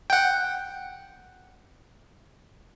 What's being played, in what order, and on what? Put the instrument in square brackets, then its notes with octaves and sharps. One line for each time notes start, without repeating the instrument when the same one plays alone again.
[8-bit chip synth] F#5 G5